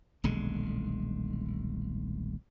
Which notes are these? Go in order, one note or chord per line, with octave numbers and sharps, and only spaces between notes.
D#1 B1 D3 G#3